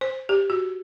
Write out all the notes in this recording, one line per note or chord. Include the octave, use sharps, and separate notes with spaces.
C5
G4
F#4